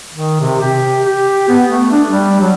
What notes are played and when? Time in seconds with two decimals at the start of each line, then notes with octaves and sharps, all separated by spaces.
0.14 D#3
0.41 C3
0.61 G4
1.05 G4
1.48 B3
1.69 A3
1.91 D4
2.08 G3
2.41 F#3